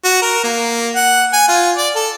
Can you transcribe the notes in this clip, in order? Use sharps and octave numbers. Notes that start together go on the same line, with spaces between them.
F#4
A#4
A#3
F#5
G#5
F4
D5
A4